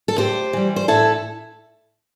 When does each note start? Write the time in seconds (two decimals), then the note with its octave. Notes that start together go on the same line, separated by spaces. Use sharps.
0.08 A4
0.18 A2 G4 C5
0.53 E3 G3
0.76 C5
0.88 A2 E4 A4